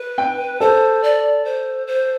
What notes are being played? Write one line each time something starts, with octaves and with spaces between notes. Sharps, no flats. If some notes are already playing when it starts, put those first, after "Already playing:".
Already playing: B4
G5
A4 C5
D5
C5
C5